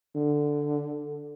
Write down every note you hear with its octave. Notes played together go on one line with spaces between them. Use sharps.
D3